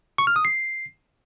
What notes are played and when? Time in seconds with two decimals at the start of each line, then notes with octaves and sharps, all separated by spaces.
0.18 C#6
0.27 F6
0.36 D#6
0.45 C7